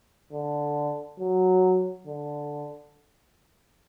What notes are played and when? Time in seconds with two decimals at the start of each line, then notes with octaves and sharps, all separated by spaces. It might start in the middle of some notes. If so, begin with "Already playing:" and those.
0.33 D3
1.20 F#3
2.07 D3